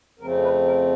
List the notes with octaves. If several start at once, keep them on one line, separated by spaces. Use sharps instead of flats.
F2 C#3 F3 A3 C4 A#4
B4
A#4